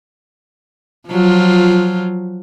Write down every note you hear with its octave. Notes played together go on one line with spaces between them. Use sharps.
F3 F#3 F4